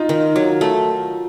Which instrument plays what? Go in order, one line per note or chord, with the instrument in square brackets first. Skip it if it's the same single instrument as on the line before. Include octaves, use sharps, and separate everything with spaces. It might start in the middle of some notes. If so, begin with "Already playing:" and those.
Already playing: [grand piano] D#4 F4
[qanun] D#3
F#3
A3